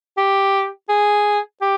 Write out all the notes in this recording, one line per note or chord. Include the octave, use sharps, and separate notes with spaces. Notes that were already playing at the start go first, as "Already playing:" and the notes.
G4
G#4
G4